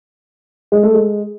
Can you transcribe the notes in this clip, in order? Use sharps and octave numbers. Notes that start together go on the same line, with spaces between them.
G#3
A3
G#3